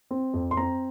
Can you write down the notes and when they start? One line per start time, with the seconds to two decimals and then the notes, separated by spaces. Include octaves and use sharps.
0.11 C4
0.34 F2
0.51 C6
0.57 C4 A#5